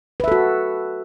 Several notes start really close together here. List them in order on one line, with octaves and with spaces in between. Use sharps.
B4 E5 A4 F#4